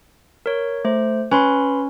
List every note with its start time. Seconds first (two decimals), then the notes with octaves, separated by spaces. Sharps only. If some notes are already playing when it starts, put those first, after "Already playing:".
0.46 A#4 C#5
0.85 A3 C5
1.31 C#4 B4 B5 C6